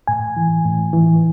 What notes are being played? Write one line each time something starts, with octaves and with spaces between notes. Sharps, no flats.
A2 G#5
E3
A2
E3